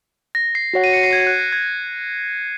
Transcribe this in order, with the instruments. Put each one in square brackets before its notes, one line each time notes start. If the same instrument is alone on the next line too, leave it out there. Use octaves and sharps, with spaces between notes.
[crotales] A#6
C7
[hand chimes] F#4 C#5 F#5
[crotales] D#7
C#7
C7
G#6
F#6
A#6
G#6